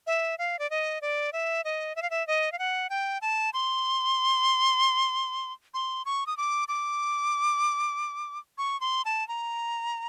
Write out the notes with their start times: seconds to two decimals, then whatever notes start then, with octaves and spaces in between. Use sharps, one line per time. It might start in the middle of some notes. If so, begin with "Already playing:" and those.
0.07 E5
0.39 F5
0.59 D5
0.70 D#5
1.02 D5
1.33 E5
1.65 D#5
1.96 E5
2.02 F5
2.10 E5
2.27 D#5
2.52 F5
2.59 F#5
2.90 G5
3.22 A5
3.53 C6
5.74 C6
6.05 C#6
6.27 D#6
6.37 D6
6.68 D6
8.58 C#6
8.81 C6
9.05 A5
9.28 A#5